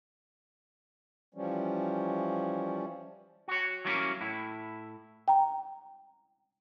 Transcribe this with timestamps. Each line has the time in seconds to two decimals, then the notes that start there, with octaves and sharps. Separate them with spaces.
1.34 E3 F3 G3 C#4
3.48 F#4 C#5
3.85 E3 F#3 G3 A#3 C#4
4.21 A2 E4
5.28 G5 A#5